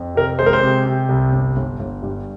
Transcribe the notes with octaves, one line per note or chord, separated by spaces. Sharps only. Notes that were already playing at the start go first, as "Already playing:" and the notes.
Already playing: F2
C3 A#4
G#3 C5
A#4
C5
C3
C3
C2
G1
G1
G1
G2